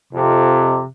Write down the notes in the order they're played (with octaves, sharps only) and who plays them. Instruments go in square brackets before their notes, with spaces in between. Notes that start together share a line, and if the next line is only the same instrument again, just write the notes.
[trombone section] F2 [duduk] C3